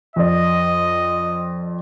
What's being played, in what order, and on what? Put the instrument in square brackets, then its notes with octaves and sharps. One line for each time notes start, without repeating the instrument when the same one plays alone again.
[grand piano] F2 D5 [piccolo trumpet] D#5